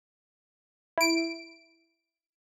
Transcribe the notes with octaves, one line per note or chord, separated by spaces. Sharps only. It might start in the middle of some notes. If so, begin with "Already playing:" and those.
E4 D7